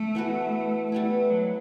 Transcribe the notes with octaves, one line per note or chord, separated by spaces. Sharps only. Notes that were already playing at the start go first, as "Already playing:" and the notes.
Already playing: A3
E3 B3 F#4 B4
G3 A3 B3 E4
F#3